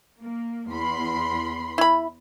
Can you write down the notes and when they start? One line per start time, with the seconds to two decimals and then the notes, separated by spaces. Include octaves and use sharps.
0.20 A#3
0.69 E2 B5 C6
1.78 E4 B5